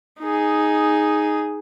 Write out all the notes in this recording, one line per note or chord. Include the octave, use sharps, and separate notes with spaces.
D#4 G#4